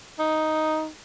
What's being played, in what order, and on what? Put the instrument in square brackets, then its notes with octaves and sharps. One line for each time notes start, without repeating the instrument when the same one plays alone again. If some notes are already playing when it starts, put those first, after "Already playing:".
[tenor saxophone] D#4